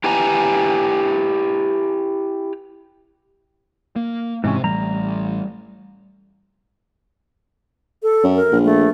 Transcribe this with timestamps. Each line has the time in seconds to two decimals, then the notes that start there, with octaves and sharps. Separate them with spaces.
0.04 E4 G4 B4 G#5 A#5
3.96 A#3
4.44 G#2 C3 E3 C#4
4.64 A1 G3 A#5
8.03 A4
8.23 F#2
8.35 A#4
8.52 A#1
8.64 A3